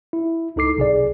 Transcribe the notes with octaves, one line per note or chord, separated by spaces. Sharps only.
E4
C#2 D#4 A4 D6 C7
B1 C3 G#4 D5